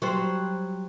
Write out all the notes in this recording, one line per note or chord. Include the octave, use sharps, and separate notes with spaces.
F#3 G3 C5